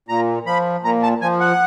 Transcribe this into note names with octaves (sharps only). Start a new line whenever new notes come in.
A#2 A#5
F3 B5
A#2 A#5
A5
F3 G#5
F#5